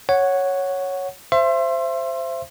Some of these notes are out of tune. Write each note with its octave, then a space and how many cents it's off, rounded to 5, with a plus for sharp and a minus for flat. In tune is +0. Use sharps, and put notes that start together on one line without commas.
C#5 +0 F#5 +0
C5 +0 E5 +35 C6 +20